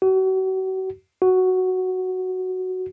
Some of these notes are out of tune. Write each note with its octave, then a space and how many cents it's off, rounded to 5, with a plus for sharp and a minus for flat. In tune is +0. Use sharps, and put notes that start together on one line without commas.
F#4 +35
F#4 +0